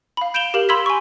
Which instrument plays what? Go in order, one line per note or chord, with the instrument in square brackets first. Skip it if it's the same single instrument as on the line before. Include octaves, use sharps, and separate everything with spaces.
[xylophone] F5 B5
G6 D7 E7 F7 G7
G4 A#4 F5 F#7
B5 C6 E6 G#6 B6
G#5 C#6